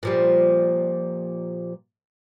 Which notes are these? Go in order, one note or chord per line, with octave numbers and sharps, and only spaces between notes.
A#2 F3 G3